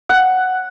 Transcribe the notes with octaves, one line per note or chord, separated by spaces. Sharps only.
F#5